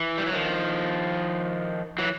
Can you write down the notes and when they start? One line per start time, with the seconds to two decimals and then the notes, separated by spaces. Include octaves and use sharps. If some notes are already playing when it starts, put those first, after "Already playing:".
Already playing: E3
0.18 G3
0.26 F#3
0.33 D#3 F3
1.98 E3 F#3